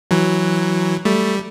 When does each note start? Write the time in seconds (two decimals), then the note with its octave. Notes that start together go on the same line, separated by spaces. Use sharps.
0.11 E3 F#3
1.05 G3 A3